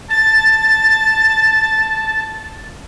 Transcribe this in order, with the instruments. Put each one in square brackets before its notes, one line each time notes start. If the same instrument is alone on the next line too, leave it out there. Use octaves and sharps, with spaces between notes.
[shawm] A5 [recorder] A6